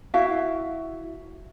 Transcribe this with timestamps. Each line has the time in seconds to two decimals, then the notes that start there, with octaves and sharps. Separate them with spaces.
0.14 E4 F#4 E5 F5